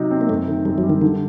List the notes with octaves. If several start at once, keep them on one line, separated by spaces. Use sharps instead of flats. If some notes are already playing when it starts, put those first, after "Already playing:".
Already playing: C3 F#3 D#4
C4
A#3
F#2 A3
D#3
F#2 G3
F#3
G3
D#3
D3 D#3